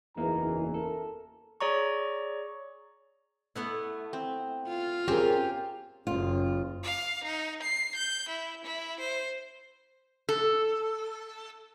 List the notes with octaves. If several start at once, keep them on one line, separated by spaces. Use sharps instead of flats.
F#1 E2 E3 A#3 B3 D#4 A#5
A4 A#4
G#4 C#5 D5 A#5 C#6
A3 B3 E4
C4
F4
C4 C#4 G4 G#4 A#4 G#5
F#1 C#4 F4
F5
D#4
C7
G6
E4
E4
C5
A4